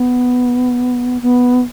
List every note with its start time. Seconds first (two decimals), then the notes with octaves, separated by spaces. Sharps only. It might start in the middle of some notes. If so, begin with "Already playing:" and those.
Already playing: B3
1.22 B3